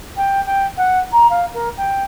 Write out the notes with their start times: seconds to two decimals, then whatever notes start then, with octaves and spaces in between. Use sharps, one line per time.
0.16 G5
0.46 G5
0.77 F#5
1.12 A#5
1.29 F5
1.53 A#4
1.77 G5